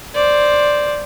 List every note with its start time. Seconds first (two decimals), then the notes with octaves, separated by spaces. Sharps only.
0.15 C5 D5